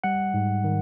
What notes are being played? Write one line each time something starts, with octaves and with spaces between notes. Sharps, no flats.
G3 F#5
G#2
D#3